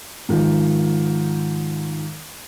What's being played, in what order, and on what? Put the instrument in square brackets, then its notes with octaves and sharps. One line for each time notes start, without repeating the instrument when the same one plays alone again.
[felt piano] G#2 D#3 F3